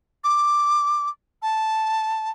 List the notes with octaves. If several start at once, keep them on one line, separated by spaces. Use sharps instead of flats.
D6
A5